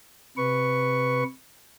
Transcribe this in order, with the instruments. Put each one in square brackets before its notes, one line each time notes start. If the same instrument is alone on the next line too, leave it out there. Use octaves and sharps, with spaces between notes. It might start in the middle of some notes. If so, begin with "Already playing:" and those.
[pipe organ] C3 B4 C#6